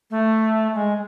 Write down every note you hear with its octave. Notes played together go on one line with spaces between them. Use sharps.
A3
G#3